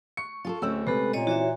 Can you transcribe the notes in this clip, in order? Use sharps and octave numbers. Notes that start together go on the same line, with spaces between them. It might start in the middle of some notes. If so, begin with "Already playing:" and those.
C#6 C#7
F4 G#4 A4
D1 C4 C#4 E6
C3 G#3 A4 B4
A#2 C#5 D#5
E3 F#4 C#5 E5